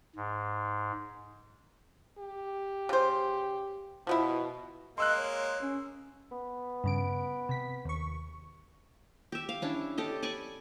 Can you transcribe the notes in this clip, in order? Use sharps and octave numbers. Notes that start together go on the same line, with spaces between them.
G#2
G4
C#3 C5
B2 F3 B3 E4
G#3 A#3 D#5 C6 E6 F#6
C#5
C#4
B3
G2 C#3 D7
C3 B6
D#2 C#6
G4 E5
F5
C#4 D4 E4
G4 A4 D#5
D5 G#5 B5 C#6